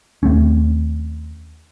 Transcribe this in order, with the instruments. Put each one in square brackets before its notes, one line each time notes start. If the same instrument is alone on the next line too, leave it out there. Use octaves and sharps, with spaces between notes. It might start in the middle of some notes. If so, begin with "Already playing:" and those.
[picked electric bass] D#2 A3 C4 C#4